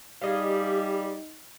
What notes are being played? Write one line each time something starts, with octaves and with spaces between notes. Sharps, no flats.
G3 D#4 G4 G#4 D#5 F5